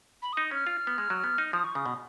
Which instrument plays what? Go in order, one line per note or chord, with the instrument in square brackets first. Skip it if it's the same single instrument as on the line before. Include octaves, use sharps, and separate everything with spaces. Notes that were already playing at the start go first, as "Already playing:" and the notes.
[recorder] B5
[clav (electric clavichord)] D#4 [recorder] D#6
[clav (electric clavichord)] C#4 [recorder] F6
[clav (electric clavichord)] F4
B3
G#3
F#3
B3
D#4
[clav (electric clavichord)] F3 [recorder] D#6
[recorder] C#6
[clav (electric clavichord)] C#3 [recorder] D#6
[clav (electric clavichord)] B2